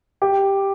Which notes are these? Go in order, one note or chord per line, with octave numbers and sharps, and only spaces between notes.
G4